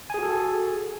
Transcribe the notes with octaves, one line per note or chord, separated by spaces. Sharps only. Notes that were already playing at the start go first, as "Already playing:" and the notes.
F#4 G#4 A4 G#5